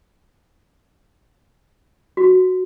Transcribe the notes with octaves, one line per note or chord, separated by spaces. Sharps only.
F#4